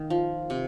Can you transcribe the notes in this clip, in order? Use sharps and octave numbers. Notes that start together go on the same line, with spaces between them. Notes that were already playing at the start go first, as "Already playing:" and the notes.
Already playing: D#3 A#3
F3
C3